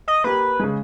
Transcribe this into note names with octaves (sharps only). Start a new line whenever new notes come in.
D#5
A#3 G4 B4
C#3 G#3